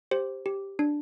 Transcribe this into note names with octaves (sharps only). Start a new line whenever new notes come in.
G4 C5
G4
D4